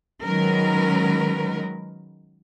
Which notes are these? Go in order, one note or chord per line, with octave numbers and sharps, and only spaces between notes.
D#3 F#3 G#3 C#4 A#4 B4